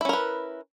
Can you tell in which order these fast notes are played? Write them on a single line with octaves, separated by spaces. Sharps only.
E4 C#4 A#4 B4